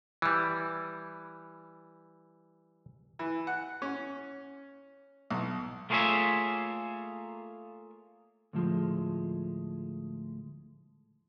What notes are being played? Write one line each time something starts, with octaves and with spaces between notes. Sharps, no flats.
E3 G3
E3
F#5
C#4
B1
A3 A#3 F4 G#4 C#5 E5
D2 A2 F3 G#3